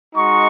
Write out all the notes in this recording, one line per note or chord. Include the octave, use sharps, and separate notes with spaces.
G#3 D#4 F#4 C#6